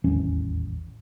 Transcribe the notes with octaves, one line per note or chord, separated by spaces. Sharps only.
D#1 A1 E2 C#4